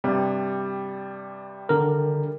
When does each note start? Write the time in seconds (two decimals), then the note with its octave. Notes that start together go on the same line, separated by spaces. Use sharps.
0.04 G2 C3 G3
1.69 D3 A#4